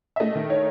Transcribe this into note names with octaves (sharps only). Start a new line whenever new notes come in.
E5
A3 D#5
D#3
D#4 C#5